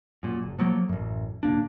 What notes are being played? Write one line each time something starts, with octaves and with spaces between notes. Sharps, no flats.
F#2 A#2
F#1
F3 F#3 A3 A#3
A1 F#2
D1 A#2 A#3 D4